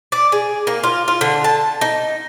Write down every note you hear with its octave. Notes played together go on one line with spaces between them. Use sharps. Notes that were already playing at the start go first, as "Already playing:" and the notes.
D5
G#4
A#3
F4
F4
D3
A5
D#4